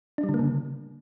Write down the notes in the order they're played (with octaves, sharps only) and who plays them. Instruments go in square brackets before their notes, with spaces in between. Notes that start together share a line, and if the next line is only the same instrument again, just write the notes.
[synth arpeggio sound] D4
G3
D3
A#3
C#3